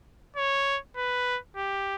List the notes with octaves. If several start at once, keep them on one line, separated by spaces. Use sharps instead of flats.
C#5
B4
G4